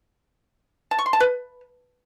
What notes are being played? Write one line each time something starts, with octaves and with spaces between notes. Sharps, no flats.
A5
C#6
C6
A5
B4